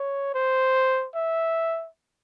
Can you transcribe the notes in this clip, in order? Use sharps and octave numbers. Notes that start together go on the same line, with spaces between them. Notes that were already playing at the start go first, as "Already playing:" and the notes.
Already playing: C#5
C5
E5